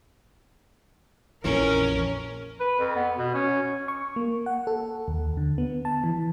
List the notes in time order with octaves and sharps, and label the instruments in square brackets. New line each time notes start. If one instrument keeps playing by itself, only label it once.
[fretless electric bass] A#1 F2 E3 [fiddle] C#4 [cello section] A#4
[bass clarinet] B4
F2
B3
B2
C#4
[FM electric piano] C#6
A#3
F#5
A4
D#2
D3
B3
A5
E3